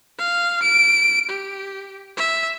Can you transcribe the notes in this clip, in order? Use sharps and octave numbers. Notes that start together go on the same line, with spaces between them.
F5
D7
G4
E5